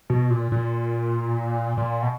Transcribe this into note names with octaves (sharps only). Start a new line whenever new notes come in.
B2
A#2
A#2
A#2
B2